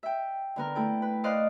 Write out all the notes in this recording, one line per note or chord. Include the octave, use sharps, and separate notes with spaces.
E5 G5
D3 B3 A#4
A3 E4 A4 G5
B4
C5 D5 D#5 F5 C6 F#6